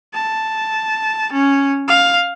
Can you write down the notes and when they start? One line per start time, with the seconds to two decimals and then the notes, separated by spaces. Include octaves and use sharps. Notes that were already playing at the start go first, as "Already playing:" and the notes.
0.14 A5
1.33 C#4
1.88 F5